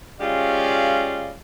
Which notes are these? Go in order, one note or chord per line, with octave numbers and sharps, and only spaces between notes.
G#3 C#4 F4 G4 D5 F5